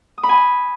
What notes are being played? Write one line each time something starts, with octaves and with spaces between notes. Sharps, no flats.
D#6
B5
G#5